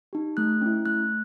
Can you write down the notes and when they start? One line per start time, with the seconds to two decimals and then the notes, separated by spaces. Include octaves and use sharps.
0.13 D#4 G4
0.37 A3 F#6
0.61 C#4 E4
0.86 A3 F#6